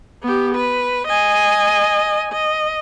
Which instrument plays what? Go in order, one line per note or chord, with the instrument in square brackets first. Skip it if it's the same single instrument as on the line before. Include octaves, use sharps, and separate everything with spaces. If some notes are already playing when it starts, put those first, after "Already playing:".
[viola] B3 G4
B4
D#5 G#5
D#5